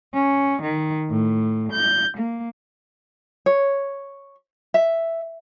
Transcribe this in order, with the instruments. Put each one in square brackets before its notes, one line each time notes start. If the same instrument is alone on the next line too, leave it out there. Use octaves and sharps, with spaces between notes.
[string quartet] C#4
D#3
A2
G6
A#3
[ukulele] C#5
E5